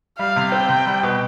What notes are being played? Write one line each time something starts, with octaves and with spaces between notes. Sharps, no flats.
G3 F5
C3
C4 G5
C3
G3
B2